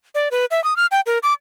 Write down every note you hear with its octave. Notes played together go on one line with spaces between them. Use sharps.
D5
B4
E5
D#6
F6
G5
A#4
D6